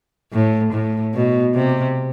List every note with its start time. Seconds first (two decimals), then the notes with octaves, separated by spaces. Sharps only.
0.33 A2
0.73 A2
1.14 B2
1.55 C3